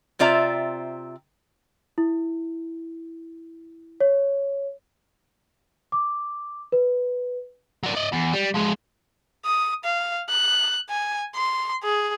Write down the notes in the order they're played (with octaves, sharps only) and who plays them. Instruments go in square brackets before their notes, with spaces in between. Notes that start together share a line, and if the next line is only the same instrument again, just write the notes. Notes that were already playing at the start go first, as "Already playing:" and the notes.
[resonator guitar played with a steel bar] C3 C4 F4 D5 E5 A#5
[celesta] E4
C#5
D6
B4
[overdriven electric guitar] F#3 D4
D5 D#5
E2
G3
F3 G#3
[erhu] D#6
F5
F#6
G#5
C6
G#4